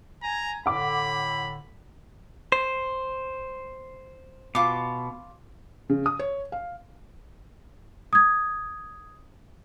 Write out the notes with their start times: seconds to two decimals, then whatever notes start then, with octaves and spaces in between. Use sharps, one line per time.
0.23 G#5 A#5
0.66 A2 D3 F#5 B5 D6
2.52 C5
4.55 B2 F4 D6
5.90 C#3
6.06 D#6
6.19 C#5
6.52 F5
8.13 D#6 G#6